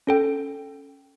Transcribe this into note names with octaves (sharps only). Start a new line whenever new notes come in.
C#4 A4 G5